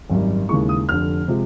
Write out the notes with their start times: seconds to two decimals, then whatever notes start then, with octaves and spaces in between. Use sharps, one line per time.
0.10 G#1 F#2 D#3 G3
0.49 D#2 C#3 E3 G#3 C#6
0.69 D#6
0.88 F1 F2 D3 F6
1.28 C3 F3 G#3